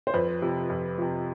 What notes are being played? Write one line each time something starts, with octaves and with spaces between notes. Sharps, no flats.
C5
F2 B4
C3 F3
F2
C3 F3